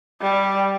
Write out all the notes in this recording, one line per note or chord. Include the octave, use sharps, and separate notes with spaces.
G3